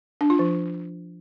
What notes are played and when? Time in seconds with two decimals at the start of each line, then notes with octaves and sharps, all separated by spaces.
0.21 D4
0.30 F4
0.39 F3